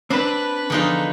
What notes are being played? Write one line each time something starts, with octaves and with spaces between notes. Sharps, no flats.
C4 D4 B4
E2 D3 F3 D#4 F4